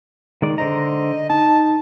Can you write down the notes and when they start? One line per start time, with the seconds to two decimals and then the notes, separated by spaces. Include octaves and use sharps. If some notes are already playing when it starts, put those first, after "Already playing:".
0.42 D#3 G#3 D5
0.58 D3 C5 D#5 A#5
1.30 D#4 A5